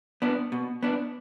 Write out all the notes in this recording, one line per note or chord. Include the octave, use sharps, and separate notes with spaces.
B3 D4
B2
B3 D4